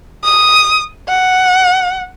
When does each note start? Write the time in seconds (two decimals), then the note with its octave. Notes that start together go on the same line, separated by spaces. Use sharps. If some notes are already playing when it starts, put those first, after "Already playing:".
0.24 D#6
1.08 F#5